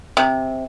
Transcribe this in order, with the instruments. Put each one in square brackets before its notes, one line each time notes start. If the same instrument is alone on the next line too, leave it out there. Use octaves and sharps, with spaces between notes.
[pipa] C3